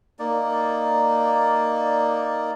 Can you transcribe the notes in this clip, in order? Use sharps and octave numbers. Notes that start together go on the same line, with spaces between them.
A#3 D#4 D5